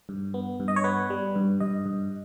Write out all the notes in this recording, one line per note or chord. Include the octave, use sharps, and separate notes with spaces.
G2
B3
G2
D#5
C#5
B3 B4
G3
G2
G2 D#5
G2